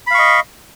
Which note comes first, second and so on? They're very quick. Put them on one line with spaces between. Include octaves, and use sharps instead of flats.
B5 F5 C#6 D#5